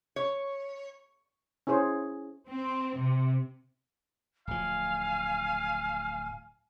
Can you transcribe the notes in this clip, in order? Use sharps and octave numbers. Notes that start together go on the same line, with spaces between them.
C#5
C#4 E4 G#4 C5 C#5
C4
C3
D1 F3 F5 G#5